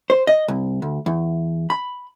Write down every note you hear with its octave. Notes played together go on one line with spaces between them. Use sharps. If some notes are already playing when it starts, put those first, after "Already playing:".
C5
D#5
C2
D2
E2
B5